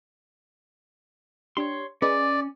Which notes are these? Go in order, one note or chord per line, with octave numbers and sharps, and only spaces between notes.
D4 G4 C#5 C6
C#4 G#4 B4 D5 D#5 G#5